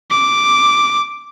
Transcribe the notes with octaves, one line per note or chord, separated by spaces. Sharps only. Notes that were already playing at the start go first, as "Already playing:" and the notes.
D6